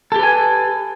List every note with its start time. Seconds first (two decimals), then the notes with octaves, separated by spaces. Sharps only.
0.12 A4
0.16 G4
0.19 B4
0.23 G#5